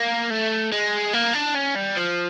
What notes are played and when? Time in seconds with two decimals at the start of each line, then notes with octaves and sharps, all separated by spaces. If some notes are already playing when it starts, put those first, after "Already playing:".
Already playing: A#3
0.30 A3
0.72 G#3
1.14 A#3
1.34 D4
1.55 C#4
1.76 G3
1.97 F3